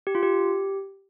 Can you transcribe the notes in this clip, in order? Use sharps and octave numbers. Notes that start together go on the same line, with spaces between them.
G4
F4
G4